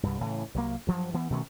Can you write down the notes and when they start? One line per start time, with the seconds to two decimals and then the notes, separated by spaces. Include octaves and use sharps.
0.03 C2 G2
0.21 A2 C#3 E3
0.54 C2 F#3 A#3
0.87 G2 F3 F#3
1.14 E3 B3
1.30 B2 D#3 A3 C#4